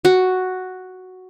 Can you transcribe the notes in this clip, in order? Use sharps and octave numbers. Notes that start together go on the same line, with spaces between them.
F#4